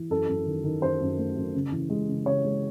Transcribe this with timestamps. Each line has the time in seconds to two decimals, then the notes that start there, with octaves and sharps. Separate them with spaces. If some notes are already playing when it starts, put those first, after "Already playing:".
Already playing: E3
0.10 F#2 A4
0.29 F#2
0.46 D#3
0.64 D#3
0.82 F#2 C5
1.01 F#2
1.18 A3
1.36 F#2
1.54 C#3
1.72 E3
1.90 G#3
2.08 C#3
2.26 C#3 C#5
2.44 G#3